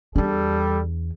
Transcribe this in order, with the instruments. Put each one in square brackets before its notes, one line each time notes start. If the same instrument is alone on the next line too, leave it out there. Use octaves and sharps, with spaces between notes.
[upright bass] E2 D4 [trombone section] G3 A4